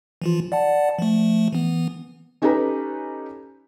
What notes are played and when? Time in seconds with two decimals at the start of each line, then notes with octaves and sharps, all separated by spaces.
0.22 E3 F3 F4
0.52 D5 F#5 A5
0.99 F3 A3
1.53 E3 B3
2.42 C#4 D#4 G4 A4 B4 A#5